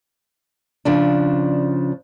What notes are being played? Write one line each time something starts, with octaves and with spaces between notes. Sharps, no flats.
C#3 F3 D4